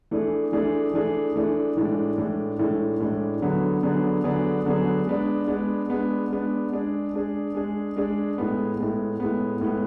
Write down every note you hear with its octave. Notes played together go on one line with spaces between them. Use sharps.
E3 A3 D4 G#4
E3 A3 D4 G#4
E3 A3 D4 G#4
E3 A3 D4 G#4
A2 E3 G#3 D4
A2 E3 G#3 D4
A2 E3 G#3 D4
A2 E3 G#3 D4
D3 F#3 B3 D4 G#4
D3 F#3 B3 D4 G#4
D3 F#3 B3 D4 G#4
D3 F#3 B3 D4 G#4
G#3 B3 D4
G#3 B3 D4
G#3 B3 D4
G#3 B3 D4
G#3 D4 G#4
G#3 D4 G#4
G#3 D4 G#4
G#3 D4 G#4
A2 G#3 B3
A2 G#3 B3
A2 G#3 B3
A2 G#3 B3